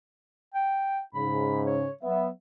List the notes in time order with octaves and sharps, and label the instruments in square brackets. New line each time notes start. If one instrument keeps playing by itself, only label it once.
[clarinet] G5
[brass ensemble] G#2 C#3 [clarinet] B5
[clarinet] C#5
[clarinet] F#3 [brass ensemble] B3 E5